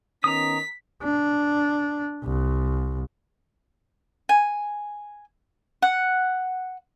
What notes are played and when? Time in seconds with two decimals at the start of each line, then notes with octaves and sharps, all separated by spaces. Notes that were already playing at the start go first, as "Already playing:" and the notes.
0.24 D#3 B3 C#4 A#5 D#6 B6
1.03 D4
2.24 C2
4.29 G#5
5.82 F#5